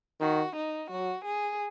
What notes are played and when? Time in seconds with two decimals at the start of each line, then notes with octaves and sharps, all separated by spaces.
0.21 D#3 F#4
0.56 D#4
0.90 F#3 F#4
1.25 G#4